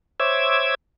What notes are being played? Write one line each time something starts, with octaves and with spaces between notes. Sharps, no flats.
C5 C#5 E5 D6 E6 G#6